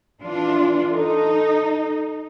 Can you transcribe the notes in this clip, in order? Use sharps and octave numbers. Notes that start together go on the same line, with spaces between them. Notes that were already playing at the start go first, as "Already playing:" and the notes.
E3 D4 F4
D#4 A4